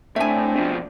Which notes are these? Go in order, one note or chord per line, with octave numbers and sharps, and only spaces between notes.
A2 A3 C4 D4 E5 G#5
B2 F3